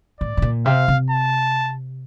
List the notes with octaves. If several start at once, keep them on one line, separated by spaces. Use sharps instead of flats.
A2 D5
A2
A#2
C3 F5
C3
A5